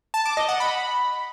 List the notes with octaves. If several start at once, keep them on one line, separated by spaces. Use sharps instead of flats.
A5
D6
D#5
F#5
B5